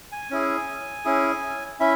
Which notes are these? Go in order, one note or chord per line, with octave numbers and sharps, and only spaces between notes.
G#5
C#4 E4 G#4
C#4 E4 G#4
C#4 E4 E5